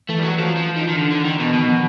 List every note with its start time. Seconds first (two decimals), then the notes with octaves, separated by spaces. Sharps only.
0.09 E3 A3
0.19 G3
0.23 F#3
0.38 F3
0.57 F3
0.77 D#3
0.89 D#3
0.96 D3
1.11 D3
1.25 D#3
1.40 B2
1.53 B2 D#3
1.68 F3